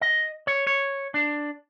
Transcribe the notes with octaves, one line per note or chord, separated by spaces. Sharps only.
D#5
C#5
C#5
D4